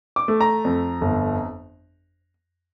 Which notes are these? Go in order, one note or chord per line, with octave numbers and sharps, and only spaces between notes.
D6
A3
A#5
F2
G1